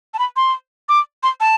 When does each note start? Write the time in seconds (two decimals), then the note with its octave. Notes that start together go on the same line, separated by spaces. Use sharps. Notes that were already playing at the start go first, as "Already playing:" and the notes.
0.14 A5
0.19 B5
0.36 C6
0.89 D6
1.23 C6
1.40 A5